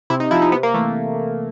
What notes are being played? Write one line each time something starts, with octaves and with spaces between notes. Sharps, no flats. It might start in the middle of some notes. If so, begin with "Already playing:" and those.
C3 E4
D#4
F3 E4
D#4
C3 B3
A#3
E3 A3